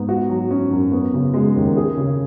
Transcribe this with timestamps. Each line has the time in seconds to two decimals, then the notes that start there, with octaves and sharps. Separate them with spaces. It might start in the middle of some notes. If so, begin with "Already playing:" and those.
Already playing: G#2 B3
0.09 F#4
0.29 F#3
0.51 C#4
0.71 F#2
0.92 B3
1.14 C#3
1.34 G#3
1.56 D#2
1.77 G#4
1.97 C#3